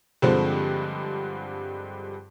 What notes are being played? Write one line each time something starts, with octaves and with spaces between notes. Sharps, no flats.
G2 D3 F3 G#3 C4